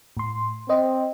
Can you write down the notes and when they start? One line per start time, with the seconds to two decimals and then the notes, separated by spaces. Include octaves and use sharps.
0.17 A2 C6
0.69 C4 C5 D#5